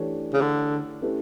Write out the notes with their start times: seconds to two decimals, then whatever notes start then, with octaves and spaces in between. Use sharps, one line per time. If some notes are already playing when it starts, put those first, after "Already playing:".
Already playing: E3 A3 D4 G4 C#5
0.34 C#3
0.41 D3
1.02 A3 C#4 E4 G4 B4